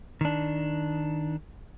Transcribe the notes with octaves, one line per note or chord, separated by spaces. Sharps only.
D#3 D4